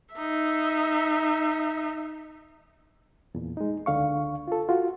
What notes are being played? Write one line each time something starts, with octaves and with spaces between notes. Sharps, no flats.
D#4 E5
E2 A#2
G#3 D#4
C#2 D3 F5 C#6
F4 A4
F4 F#4